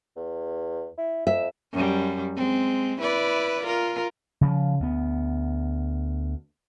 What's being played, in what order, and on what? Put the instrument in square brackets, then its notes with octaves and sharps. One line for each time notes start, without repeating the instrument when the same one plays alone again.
[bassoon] E2
E4
[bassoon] F2 [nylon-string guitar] E5
[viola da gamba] F#2 G3
G#3 C4
E4 B4 D5
F4 A#4
[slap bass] C#3 F3
D2 B3